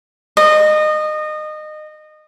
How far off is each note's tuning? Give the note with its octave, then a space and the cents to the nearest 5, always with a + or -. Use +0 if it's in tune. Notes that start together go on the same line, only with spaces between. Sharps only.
D#5 -25